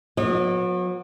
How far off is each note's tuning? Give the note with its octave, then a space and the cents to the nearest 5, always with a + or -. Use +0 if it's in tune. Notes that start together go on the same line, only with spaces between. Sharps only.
F#3 -40 B3 +0 D#5 -40